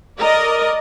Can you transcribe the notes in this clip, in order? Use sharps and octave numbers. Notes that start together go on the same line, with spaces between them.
A#4 D5 D#5